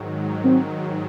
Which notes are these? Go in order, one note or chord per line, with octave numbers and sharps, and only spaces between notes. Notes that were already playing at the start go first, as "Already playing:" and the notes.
Already playing: G#2 D#3 F#3
C4